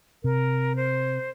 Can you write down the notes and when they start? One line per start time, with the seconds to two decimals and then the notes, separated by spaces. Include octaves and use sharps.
0.24 C3 A#4
0.76 C5